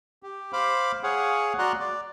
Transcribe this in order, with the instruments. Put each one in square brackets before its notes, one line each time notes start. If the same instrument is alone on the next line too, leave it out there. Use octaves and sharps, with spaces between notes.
[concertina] G4
C5 F5 B5 D6
G#4 C#5 F5 F#5
F#4 D5 A#5 C6 F#6
D5